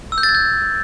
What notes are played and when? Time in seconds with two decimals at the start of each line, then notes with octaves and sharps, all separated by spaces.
0.12 E6
0.18 G6
0.23 A6
0.29 G#6
0.35 G6